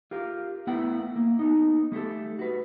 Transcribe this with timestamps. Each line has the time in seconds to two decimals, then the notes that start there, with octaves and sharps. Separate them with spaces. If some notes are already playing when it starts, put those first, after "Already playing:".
0.11 F4 G4 A#4
0.67 A3 B3 E4 A#4 F#5 G5
1.16 A#3
1.39 B3 D#4
1.92 G3 A3 G4 A4
2.39 F#4 B4